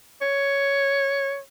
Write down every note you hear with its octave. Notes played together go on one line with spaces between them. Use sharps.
C#5